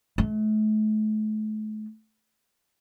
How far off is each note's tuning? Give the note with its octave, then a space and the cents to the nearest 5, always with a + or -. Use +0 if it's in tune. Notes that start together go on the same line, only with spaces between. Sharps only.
A3 -40